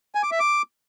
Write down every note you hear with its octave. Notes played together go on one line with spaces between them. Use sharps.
G#5
D6
E5
D6